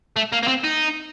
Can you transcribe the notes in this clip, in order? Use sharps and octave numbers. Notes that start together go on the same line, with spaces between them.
A3
A#3
A#3
C4
D#4